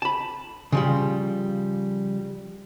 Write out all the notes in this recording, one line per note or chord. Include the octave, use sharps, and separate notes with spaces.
A5 B5
C#3 F3 G3